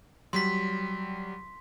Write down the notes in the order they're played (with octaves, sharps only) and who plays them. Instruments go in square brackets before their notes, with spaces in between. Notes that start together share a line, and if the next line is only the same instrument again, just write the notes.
[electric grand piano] F#3 G3 [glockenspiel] C6 B6